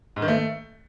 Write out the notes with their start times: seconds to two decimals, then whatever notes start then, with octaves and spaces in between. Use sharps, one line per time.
0.16 G#2
0.22 D#3
0.28 A3